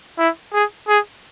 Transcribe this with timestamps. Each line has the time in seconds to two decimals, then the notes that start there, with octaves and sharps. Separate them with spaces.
0.18 E4
0.54 G#4
0.88 G#4